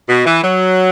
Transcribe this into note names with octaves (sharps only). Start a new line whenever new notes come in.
B2
E3
F#3